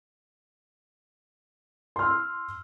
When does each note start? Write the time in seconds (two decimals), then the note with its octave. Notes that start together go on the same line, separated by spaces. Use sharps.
1.96 C6
1.99 F6
2.02 E6